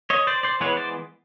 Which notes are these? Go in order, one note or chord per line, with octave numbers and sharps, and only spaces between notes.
C#5 D#5
C5 D5
C5 D5
E3 G#3 B3 B4 C#5
C5 D5